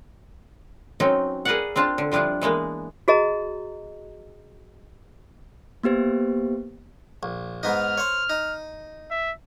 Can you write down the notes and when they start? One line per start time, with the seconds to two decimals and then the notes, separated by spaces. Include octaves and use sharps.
1.00 F#3 C4 C#4 D#4
1.45 G#4 A#4 B4 D5 F5 F#5
1.76 C4 D4 F4 A5
1.98 D3
2.12 F3 G3 D4 E4 F4
2.42 E3 G#3 A#3 B3
3.08 F#4 G#4 D#5 A#5
5.83 A#3 B3 G4 C5
7.23 A#1
7.63 G#2 B3 D#4 F6
7.98 C5 C#5
8.29 D#4
9.11 E5